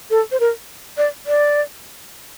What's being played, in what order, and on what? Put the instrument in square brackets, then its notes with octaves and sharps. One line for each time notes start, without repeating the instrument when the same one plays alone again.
[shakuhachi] A4
C5
A#4
D5
D5